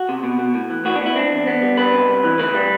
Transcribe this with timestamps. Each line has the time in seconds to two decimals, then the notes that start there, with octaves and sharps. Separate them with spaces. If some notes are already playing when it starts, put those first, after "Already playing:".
Already playing: F#4
0.09 C3
0.24 B2
0.39 B2
0.55 A2
0.70 E3
0.85 A2 F#4
0.96 D4
1.01 B3 E4
1.16 C4 D4
1.32 E2
1.47 B3
1.62 G3
1.77 D4 B4
1.93 C3
2.08 C2
2.24 E3
2.39 D2 B4
2.54 G3